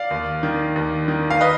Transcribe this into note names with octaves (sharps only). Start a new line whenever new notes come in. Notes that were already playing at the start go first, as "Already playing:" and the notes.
Already playing: D5 F5
D#2
D#3
D#2
D#3
F5
B4 D#5